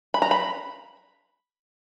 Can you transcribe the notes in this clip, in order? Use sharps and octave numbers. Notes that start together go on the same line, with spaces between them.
B5
A#5
B5